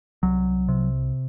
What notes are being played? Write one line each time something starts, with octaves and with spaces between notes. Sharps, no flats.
C2 F#3
C3